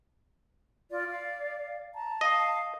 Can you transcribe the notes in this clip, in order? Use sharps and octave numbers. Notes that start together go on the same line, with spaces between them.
F4 D5
F5
A5 A#5
D#5 F5